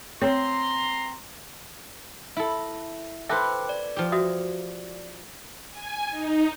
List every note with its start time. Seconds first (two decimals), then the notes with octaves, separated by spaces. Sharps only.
0.22 C4 C#5 A#5 C6
2.37 E4 A4 E5
3.29 A4 B4 C5 E5 G5 D6 F#6
3.69 D5
3.96 F3 G4
4.12 F#4 E5 D#6
5.71 G#5
6.11 D#4